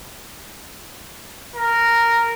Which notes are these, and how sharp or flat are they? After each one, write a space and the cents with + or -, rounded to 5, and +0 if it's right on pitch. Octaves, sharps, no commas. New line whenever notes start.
A#4 -5